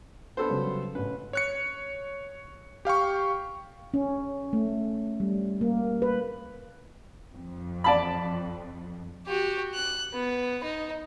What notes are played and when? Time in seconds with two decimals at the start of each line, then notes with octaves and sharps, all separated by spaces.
0.37 B3 D4 A4 C5
0.50 C#3 F#3 G3
0.95 A1 C#4 B4
1.33 C#5 F#6 C#7
2.85 G4 F5 G5 C#6
3.94 C#4
4.53 A3
5.20 G3
5.61 A#3
6.02 B4
7.34 F2
7.84 D5 A5 B5
9.27 F#4 G4
9.74 F#6
10.13 B3
10.63 D#4